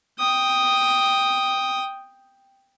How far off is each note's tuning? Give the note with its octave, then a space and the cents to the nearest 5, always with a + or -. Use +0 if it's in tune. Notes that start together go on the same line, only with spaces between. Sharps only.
G5 +5 D#6 +0